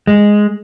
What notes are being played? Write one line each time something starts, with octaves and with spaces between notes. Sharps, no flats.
G#3